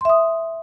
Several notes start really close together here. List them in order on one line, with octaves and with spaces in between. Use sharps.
C6 E5 D#6